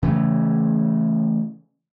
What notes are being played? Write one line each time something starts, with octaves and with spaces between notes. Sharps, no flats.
C#3 E3 A3